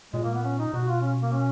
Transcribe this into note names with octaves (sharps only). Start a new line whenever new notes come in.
A#2 G#3
A#3
B3
C#4
D#4
B2 F#4
F4
C#4
A#3
C#4